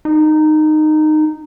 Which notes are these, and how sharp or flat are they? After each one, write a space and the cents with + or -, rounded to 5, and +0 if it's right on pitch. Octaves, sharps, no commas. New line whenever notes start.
D#4 -15